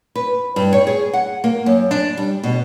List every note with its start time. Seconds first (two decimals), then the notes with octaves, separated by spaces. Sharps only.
0.15 B4
0.56 G2
0.73 C#5
0.87 G#4
1.13 F#5
1.44 A#3
1.66 F#2
1.91 D4
2.17 G3
2.43 B2